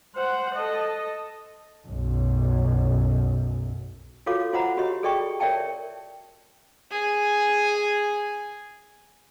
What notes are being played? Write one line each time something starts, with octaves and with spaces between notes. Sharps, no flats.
C5 F#5
A4 D#5
B1 F#2
F4 F#4 A4 C#5 F5 D6
F4 C5 D#5 F#5 A#5 B5
F#4 G4 C#5 D#5
G#4 A4 D5 D#5 G5 C#6
A#4 C#5 D5 E5 G5 A5
G#4 G#5